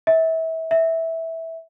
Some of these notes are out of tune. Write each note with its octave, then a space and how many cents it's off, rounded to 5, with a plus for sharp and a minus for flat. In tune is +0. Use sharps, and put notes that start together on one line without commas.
E5 -30
E5 -10